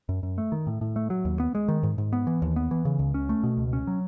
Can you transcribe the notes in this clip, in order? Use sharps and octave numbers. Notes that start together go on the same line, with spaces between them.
F#2
F#2
A3
D#3
A2
A2
A3
F#3
D#2
B3
G#3
D#3
G#2
G#2
B3
E3
D#2
B3
E3
C#3
C#2
C#4
A3
B2
C#2
C#4
F#3